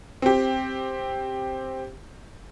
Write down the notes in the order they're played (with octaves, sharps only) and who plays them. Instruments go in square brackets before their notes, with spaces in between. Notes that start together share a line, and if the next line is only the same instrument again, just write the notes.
[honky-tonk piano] C4 G4